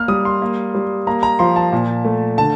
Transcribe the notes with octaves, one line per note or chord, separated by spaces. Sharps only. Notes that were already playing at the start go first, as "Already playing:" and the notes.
Already playing: A#3 F6
G3 D#6
C6
A#3
G3
A#3 A#5
A#5
F3 C6
A5
A#2
A3
D3 A5